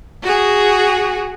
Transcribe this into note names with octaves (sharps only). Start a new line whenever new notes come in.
F#4 G#4